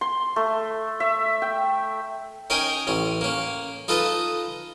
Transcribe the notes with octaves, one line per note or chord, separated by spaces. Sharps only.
C6
A3
E5
G5
C#4 D#4 A#4 D#5 G5 G#5
A1 C#4
A#3 C#4
D#4 F4 A4 B4 D#5 A#5